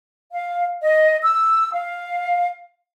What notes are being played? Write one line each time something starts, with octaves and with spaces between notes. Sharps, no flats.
F5
D#5
E6
F5